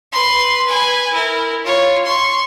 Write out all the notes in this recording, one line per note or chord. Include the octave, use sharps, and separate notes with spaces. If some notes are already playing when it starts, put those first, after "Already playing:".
B4 C6
B4 G#5
E4 A#4
F4 C#5
C6 C#6